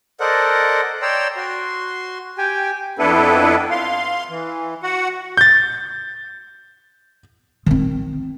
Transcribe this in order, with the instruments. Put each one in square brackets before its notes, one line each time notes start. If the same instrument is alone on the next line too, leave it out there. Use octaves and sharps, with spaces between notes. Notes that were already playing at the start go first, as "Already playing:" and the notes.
[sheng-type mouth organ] A4 A#4 C5 D5 D#5 F#5
C#5 D5 G5 A#5 C6 E6
F#4 C6
G4 G5 G#5
[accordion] F2 B3 D4 E4 A4 B4
F5 C6
E3
F#4 F#5
[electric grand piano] G6 A6
[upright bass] D#3 C4